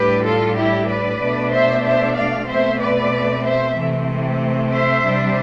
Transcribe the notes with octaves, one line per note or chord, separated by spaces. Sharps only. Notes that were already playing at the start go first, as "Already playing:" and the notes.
Already playing: A2 G3 D4 G4 B4
F4 A4
E4 G4
B4 D5
B2 A3 D4
C5 E5
C5 E5
D5 F5
B2 A3 C4 C5 E5
B4 D5
C5 E5
C3 E3 A3 C4
C5 E5
C3 G3 D4